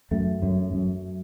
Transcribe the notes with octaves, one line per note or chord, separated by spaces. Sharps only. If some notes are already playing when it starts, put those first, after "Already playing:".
F#2 A3
F#2
F#2